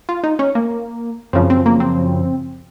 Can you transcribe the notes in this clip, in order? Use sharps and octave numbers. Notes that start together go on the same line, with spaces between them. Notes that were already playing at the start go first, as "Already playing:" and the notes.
F4
D#4
C#4
A#3
F#2 C#3 F3 C4
C4
A#3
C4